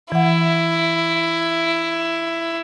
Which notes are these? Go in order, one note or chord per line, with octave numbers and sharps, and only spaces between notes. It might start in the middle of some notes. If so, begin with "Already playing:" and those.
E3 E4 F#5